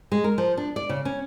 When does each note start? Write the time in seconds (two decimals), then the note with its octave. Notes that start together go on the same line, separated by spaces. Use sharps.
0.12 G#3
0.24 A#4
0.38 F3
0.57 D4
0.76 D5
0.89 C#3
1.05 C#4